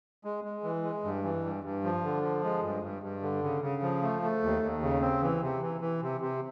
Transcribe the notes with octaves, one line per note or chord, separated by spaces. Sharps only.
G#3
G#3
E3
G#3
G2
E3
G2
G2
F3
D3
F3
G#3
G2
G2
G2
D3
C#3
C#3
F3
A3
A3
D#2
D#2
C#3
C4
E3
C3
E3
E3
C3
C3